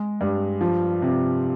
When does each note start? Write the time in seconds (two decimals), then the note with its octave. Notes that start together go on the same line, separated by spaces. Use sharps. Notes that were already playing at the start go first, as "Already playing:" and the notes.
Already playing: G#3
0.21 G2
0.61 F3
1.02 C3